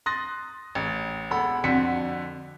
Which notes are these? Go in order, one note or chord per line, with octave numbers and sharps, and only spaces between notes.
C6 D#6 F#6 A6 A#6
A1
E1 A4 F#5 B5
F2 D3 F#4 B6 C#7